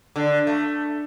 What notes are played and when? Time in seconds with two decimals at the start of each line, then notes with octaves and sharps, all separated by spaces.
0.16 D3
0.47 A3